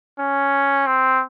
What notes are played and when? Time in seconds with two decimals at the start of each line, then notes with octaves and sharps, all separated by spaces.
0.19 C#4
0.86 C4